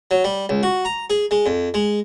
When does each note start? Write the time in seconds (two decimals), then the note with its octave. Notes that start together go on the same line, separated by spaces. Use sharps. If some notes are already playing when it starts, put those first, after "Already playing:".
0.11 F#3
0.24 G3
0.49 C#2
0.63 F#4
0.85 A#5
1.10 G#4
1.31 G#3
1.46 F2
1.74 G#3